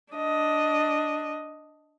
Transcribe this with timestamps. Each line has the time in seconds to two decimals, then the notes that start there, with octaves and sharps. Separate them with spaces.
0.13 D4 D#5